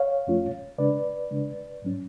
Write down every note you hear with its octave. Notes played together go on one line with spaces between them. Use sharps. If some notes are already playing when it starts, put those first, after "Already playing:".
Already playing: C#5 F5
F2 F3 A3 C#4 F4
C#3 G#3 D4 B4 D5
C#3 G#3 D4
G#2 F#3 C#4